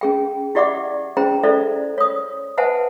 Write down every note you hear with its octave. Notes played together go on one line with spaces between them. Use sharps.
C#4 G#4 G5
E4 G4 D5 E5 F#5 D6
C#4 E4 G#4 C5 G5 A#5
E4 A4 C5 D5 E5
C#5 D#6
B4 C5 E5 F#5 G#5 A5